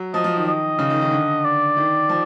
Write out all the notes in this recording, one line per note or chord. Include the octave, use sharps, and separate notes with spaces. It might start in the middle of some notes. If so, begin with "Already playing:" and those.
Already playing: F#3
F3 D#5
F3
D#3
D#5
C#3
D#3
D#3
D3
D5
D#3
F3